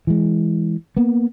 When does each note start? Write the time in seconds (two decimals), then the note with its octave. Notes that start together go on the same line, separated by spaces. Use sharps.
0.07 E3 G#3
0.97 A#3 B3